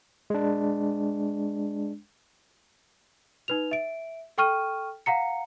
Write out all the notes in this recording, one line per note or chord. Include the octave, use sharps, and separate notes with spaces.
G#3 D4
D#4 B4 F7
E5 D7
A4 G5 C#6 F6 D#7
F5 F#5 A#5 C#7